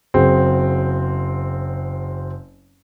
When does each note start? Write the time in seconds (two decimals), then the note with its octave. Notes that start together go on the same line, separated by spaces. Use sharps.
0.14 F#1 F#3 C4 G#4